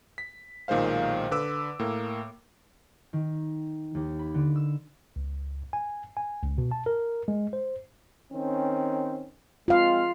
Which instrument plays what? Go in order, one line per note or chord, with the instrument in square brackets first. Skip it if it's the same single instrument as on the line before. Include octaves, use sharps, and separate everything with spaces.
[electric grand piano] B6
B1 A#2 D#3 G#3 C5 F5
D3 B4 D6 E6
A2 A#3
[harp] D#3
D#2
B5
D3
E6
[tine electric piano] C#2
G#5
G#5
C#2
B2
A5
A#4
G#3
C5
[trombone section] D#3 C4 C#4
[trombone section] G#3 C4 [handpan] F4 F5